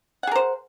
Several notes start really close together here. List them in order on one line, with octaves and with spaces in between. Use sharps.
F#5 G#4 A#4 C5